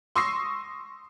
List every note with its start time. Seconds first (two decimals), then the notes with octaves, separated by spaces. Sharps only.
0.16 C6 C#6 D#6 E6 A#6 C7